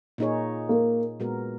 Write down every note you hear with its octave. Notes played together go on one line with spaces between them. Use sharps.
A#2 A#3 D#4 G#4 C#5
A#3
A#2 G#3 B3 F#4 A#4